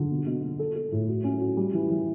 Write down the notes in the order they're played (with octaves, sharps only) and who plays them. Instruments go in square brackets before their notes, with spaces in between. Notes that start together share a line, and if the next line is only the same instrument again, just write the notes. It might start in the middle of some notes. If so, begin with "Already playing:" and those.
Already playing: [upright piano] D3
B2
B2
B2
A4
A4
A2
F#4
C#4
F#4
G3
E3
E3